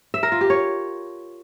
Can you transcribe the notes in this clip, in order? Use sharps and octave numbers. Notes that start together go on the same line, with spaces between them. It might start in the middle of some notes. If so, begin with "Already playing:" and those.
E5
A#4
F4
G4
C#5